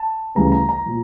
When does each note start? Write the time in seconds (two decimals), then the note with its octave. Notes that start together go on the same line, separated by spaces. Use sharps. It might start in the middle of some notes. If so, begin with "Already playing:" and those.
Already playing: A5
0.35 D2 C#3 E3 G3 A#5
0.52 A#5
0.69 A#5
0.86 A#2 F3